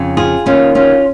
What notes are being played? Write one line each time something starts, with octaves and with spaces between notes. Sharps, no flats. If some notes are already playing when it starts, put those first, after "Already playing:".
Already playing: F2 C#3
F4 G#4
D#2 D#3 C#4 F4
C#4 F4